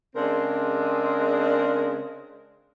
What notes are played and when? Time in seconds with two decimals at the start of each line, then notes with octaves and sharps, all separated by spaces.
0.16 C#3 G#3 C4 D4 A#4